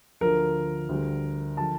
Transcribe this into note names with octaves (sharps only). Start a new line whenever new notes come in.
D2 D3 F3 A#4
D2 D3 G3
D3 F3 A5